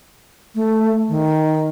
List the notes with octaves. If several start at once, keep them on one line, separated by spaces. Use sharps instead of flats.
A3
D#3